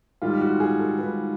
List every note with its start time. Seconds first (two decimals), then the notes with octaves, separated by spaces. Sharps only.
0.22 G#2 D#3 G3 F4
0.41 F#4
0.60 G#4
0.79 A4
0.99 G#2 D#3 G3 B4